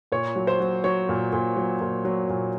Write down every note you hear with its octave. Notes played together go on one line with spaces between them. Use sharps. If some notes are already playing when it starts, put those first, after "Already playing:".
A#2 C#5
F#3
C5
F#3
F#3 C#5
A#2
A#2
F#3
A#2
F#3
A#2